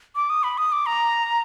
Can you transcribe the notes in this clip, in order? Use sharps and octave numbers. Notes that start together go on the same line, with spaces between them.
D6
D#6
B5
D#6
D6
A#5